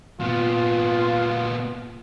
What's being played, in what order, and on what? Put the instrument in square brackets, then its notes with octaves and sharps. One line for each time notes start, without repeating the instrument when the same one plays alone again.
[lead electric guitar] A#2 B3 [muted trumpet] F4